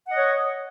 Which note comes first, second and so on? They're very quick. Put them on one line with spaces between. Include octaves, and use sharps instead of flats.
F#5 D#5 C#5